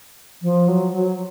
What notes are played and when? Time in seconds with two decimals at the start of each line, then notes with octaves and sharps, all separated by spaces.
0.43 F3
0.68 F#3
0.93 F#3